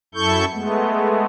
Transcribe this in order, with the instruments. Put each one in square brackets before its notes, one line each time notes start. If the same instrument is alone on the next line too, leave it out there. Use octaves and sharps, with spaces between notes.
[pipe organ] F#2 E4 A4 C#6 G6
G#3 A3 B3